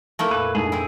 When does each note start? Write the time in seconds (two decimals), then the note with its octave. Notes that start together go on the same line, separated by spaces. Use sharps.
0.19 A3 A#3 E4
0.31 F2 A#2 B4 E6
0.55 F2 G#2 D4 E4 G#4
0.72 C4 E4 G5